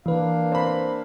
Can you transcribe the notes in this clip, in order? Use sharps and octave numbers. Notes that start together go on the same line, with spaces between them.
E3 A#3 D4 B4 F5
C4 B5